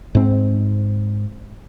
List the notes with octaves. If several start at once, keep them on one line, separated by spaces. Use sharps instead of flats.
G#2 C4